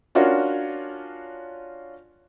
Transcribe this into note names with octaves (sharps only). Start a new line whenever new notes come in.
C#4 D4 F4 F#4 A#4 C#5